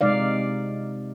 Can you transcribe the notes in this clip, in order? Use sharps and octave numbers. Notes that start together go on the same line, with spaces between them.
C3 G#3 D#4 D5 F5